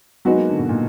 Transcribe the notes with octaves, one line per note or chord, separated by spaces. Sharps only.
F#3 G#3 B3 D#4 F#4
A#3
D3
B2
A#2